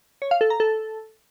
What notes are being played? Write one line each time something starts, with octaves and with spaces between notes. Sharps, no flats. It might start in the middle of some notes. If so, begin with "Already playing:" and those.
C#5
F5
A4
A#5
A4